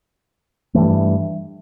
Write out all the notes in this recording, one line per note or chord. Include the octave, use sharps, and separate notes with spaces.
G2 E3 A3